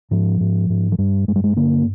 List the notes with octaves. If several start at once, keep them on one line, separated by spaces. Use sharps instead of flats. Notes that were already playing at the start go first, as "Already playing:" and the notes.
G#2 F3
G#2
G#2
F3
G2 G3
G2 G#3
G3
G#3
D3 A#3